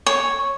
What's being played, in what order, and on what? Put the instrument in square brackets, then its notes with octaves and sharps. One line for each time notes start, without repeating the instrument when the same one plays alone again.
[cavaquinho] C#5